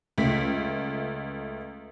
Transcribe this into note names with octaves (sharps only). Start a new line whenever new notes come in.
C#2 A3 B6